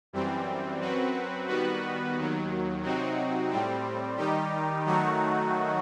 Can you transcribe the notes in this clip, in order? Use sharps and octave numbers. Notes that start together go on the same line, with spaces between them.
F#2 E3 G3 C4
F#2 F#3 C4 F#4 B4
D#3 G3 B3 F#4 B4
D#2 D#3 F#3
C3 F#3 C4 D#4 F#4
A2 G3 C4
D#3 G3 D#4 G4
D#3 F#3 A3 D#4 F#4